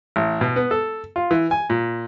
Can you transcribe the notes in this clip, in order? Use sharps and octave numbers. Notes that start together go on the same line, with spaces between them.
A1
B2
B3
A4
F4
E3
G#5
A#2